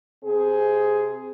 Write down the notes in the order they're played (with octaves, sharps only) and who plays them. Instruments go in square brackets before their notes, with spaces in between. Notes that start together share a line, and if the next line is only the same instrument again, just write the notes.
[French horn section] C3 C4 G#4